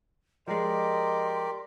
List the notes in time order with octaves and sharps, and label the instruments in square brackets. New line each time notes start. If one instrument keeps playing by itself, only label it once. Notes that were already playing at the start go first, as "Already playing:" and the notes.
[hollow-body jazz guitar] F3 G#3 [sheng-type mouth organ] G4 A#4 D5 [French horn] D#5 [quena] C6